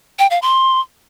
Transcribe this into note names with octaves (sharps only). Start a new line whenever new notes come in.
G5
F5
C6